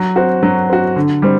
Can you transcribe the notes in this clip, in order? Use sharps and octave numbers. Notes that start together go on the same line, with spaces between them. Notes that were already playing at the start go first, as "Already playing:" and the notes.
Already playing: F#3
C4 F#4
F#3
C4 F#4
D3
G3 C4